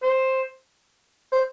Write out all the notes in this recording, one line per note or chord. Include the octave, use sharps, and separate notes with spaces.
C5
C5